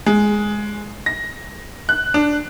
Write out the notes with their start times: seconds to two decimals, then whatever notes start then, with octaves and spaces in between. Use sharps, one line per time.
0.06 G#3
1.06 A#6
1.89 F#6
2.14 D4